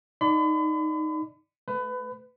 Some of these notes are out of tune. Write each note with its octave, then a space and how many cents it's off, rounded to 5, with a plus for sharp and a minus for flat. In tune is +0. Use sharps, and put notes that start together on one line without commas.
D#4 +0 D5 -5 B5 +40
A3 +0 B4 +25